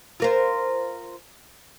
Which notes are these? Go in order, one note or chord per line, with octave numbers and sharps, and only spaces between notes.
F4 A#4 C5